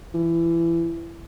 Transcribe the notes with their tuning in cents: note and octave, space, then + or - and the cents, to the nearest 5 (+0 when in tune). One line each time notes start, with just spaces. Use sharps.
E3 +25